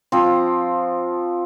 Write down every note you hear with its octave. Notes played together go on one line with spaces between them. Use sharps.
F3 C4